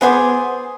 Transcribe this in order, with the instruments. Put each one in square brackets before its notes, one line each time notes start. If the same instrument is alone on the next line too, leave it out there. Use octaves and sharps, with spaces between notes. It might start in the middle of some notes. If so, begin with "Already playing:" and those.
[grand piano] B3 [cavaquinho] G#4 C5 G#5 D6